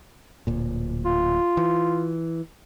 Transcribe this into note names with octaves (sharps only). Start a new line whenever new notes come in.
D1 A#2
F4
E3